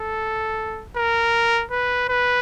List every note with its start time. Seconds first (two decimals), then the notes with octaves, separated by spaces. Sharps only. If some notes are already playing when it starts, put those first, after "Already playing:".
Already playing: A4
0.96 A#4
1.71 B4
2.09 B4